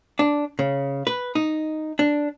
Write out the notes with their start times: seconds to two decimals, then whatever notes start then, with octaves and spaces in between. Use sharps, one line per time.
0.19 D4
0.59 C#3
1.07 B4
1.35 D#4
1.99 D4